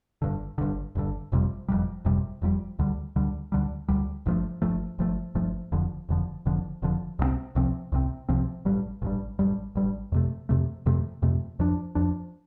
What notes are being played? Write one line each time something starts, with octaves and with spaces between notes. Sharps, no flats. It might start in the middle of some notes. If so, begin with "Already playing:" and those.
G1 G2 D3
G1 G2 D3
G1 G2 D3
F1 F2 C3 G3
F1 F2 C3 G3
F1 F2 C3 G3
F1 F2 C3 G3
D2 D3 G3
D2 D3 G3
D2 D3 G3
D2 D3 G3
G1 G2 F3 A3
G1 G2 F3 A3
G1 G2 F3 A3
G1 G2 F3 A3
F1 F2 D3 F3
F1 F2 D3 F3
F1 F2 D3 F3
F1 F2 D3 F3
C2 C3 F3 C4
C2 C3 F3 C4
C2 C3 F3 C4
C2 C3 F3 C4
A1 G2 G3
A1 G2 G3
A1 G2 G3
A1 G2 G3
F2 C3 A3
F2 C3 A3
F2 C3 A3
F2 C3 A3
F2 F3 D4
F2 F3 D4